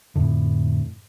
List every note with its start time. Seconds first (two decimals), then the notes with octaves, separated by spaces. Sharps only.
0.16 F2 A2 D3